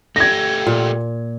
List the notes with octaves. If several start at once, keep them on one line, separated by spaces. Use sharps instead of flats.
A3 G4 G#6 A#6
A#2